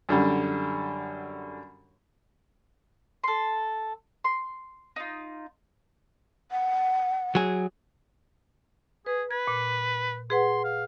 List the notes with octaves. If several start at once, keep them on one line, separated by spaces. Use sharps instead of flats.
F#2 D3 G3
A4 C6
C6
D#4 F4
F#5
F#3 G#4
G#4 B4
B4 G#6
A#2
G#4 B4 F#5 C6
F5